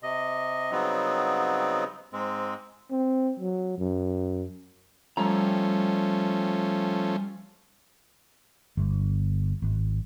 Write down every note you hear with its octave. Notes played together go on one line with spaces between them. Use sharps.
C3 D#5
C#3 F#3 G3 B3 C4 D#4
G#2 G#3 C4
C4
F#3
F#2
F3 G3 A3 C#4 A#5
G1
G#1